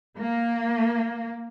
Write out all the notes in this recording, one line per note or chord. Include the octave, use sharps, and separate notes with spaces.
A#3